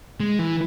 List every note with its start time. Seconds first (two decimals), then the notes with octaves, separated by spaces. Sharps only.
0.20 G#3
0.39 E3